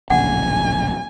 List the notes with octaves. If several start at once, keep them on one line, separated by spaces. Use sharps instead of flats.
D1 A#1 C#3 F#5 G#5